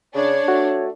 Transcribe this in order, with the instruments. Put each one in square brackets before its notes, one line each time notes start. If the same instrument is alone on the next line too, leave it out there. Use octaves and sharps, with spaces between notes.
[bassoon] C#3 [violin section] D4 [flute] C#5
[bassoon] A3 [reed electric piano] F#4